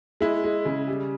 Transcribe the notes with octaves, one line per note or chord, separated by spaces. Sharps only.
G#3 E4
G#3
C#3
G3